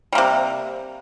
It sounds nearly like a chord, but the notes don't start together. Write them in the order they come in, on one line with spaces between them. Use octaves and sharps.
G3 A#3 C3